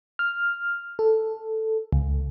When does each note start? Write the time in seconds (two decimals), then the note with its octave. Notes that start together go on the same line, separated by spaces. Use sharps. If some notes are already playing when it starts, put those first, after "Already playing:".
0.19 F6
0.99 A4
1.93 C#2